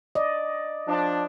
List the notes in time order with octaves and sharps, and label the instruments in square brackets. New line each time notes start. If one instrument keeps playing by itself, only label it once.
[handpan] D5 D#5
[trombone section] F3 D4